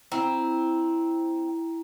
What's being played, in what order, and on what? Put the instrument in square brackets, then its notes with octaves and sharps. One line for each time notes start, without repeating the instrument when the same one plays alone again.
[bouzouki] C4 [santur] E4 [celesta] A#5